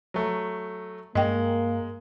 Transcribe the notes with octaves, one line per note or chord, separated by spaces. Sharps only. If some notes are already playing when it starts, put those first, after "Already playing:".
F#3 A3
G2 G#3 A#3 D#5 G5